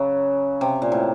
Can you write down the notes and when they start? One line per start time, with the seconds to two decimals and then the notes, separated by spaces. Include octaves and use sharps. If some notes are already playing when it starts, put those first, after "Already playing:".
Already playing: C#3 F#3
0.61 C3
0.82 A#2
0.92 A2